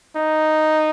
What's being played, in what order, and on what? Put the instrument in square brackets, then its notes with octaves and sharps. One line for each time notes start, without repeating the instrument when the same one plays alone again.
[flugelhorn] D#4